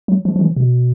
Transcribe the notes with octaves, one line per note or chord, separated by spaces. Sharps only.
F#3
F3
F3
E3
B2